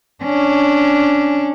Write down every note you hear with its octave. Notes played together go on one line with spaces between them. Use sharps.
C#4 D4